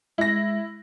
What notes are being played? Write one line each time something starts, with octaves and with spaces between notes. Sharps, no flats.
G#3 E4 A#6